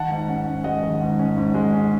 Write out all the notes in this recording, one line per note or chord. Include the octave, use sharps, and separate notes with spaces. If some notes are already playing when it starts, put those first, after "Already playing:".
Already playing: D#3 F#5 A5
G#2
C#4
G#2
G#3 D#5 F#5
D#3
G#2
C#4
G#2
G#3
C#4